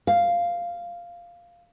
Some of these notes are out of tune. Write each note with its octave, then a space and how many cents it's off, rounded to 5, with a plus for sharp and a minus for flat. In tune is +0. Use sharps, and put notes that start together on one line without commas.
F5 -5